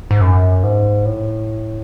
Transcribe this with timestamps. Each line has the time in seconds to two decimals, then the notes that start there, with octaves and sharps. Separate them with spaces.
0.11 G#2
0.21 F#2
0.63 G#2
1.05 A2